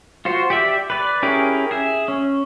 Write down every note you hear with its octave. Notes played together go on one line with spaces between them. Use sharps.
F4 F#4 C5
G4 D5 E5
B4 D5
C#4 E4 G4 G#4 A#4
G#4 E5
C#4